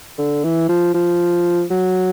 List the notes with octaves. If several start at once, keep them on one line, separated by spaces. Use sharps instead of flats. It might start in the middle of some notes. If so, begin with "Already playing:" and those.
D3
E3
F3
F3
F#3